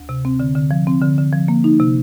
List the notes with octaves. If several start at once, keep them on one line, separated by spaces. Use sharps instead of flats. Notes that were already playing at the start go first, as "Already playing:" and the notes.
Already playing: D2
C3
C4
D3
D3
F3
C4
D3
D3
F3
A#3
D#4
C3